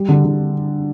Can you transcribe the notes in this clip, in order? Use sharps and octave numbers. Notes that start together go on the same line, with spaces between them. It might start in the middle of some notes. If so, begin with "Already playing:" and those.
Already playing: G3
D3
D3